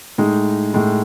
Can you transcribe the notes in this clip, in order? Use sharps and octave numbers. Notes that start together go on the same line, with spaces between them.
A2 G#3 D#4
A2 G#3 D#4